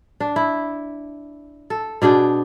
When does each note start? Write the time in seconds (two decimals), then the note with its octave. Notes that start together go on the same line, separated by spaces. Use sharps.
0.20 D4
0.36 E4
1.70 A4
2.02 B2 D4 G#4 G5